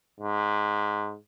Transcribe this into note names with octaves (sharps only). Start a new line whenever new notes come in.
G#2